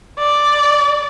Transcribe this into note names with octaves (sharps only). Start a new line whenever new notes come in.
D5